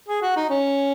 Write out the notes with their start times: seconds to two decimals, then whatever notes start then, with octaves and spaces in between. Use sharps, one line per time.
0.09 G#4
0.22 F#4
0.36 D#4
0.50 C#4